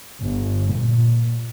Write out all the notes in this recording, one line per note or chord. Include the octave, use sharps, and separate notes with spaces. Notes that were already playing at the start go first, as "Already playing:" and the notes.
G1
A#2